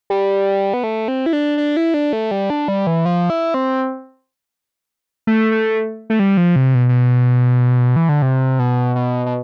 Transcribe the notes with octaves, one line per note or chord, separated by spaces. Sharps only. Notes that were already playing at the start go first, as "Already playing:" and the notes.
G3
B3
A3
C4
E4
D4
D4
E4
D4
A3
G3
D4
G3
E3
F3
E4
C4
A3
A3
A3
G3
F3
C3
B2
B2
E3
D3
C3
B2
B2
B2